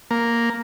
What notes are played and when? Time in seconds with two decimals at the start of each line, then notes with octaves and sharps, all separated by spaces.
0.11 A#3